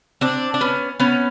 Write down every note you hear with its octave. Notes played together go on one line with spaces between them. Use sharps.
C4 D4
D4
B3 C#4
B3 C#4